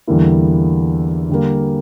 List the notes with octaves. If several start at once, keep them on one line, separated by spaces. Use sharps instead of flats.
E2 D3 G3 A#3 E4
D3 G3 A#3